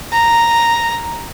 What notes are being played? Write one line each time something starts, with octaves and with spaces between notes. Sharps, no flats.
A#5